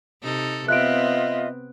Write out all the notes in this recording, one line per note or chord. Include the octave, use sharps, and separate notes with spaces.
C3 D#4 A4
B3 C4 F4 D#5 E5 F#6 D7